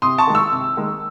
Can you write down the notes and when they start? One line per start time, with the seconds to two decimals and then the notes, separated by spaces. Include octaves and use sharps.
0.02 C3 C6 D#6
0.18 A5 C#6
0.27 D#3 G#3
0.35 C#6 E6
0.52 C3
0.77 D#3 G#3